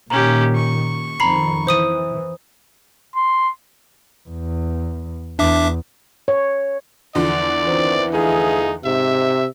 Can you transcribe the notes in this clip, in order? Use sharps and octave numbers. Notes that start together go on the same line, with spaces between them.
A#2 D#3 C#4 G4 A#5
C#6
F2 D#3 A#5 B5 C7
E3 C5 D#6 D#7
C6
E2
E2 D4 E5 D6
C#5
E2 D3 F3 D5
D#3 E3 C4
A3 D#4 F4 G#4
G#2 C3 E5